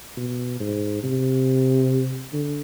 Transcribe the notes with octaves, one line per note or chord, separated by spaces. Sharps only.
B2
G#2
C3
D3